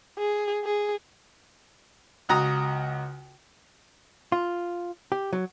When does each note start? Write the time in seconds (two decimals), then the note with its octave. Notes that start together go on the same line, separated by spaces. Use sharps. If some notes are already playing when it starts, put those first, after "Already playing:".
0.18 G#4
0.64 G#4
2.29 C#2 F#4 A#5 D#6
4.32 F4
5.12 G4
5.33 F#3